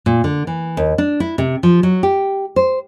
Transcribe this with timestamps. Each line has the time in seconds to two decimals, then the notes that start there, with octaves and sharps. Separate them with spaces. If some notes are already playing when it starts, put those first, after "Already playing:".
0.06 A#2
0.24 D3
0.47 E3
0.77 D#2
0.98 D4
1.20 E4
1.38 C3
1.63 F3
1.83 F#3
2.03 G4
2.56 C5